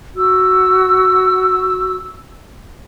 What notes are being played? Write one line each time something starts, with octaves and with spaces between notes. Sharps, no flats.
F#4 E6